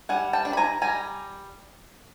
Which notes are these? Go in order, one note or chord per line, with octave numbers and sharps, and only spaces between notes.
G3 F#5 G#5
G5 A5
D4
B5
G#5 A#5
G3 G#5 A#5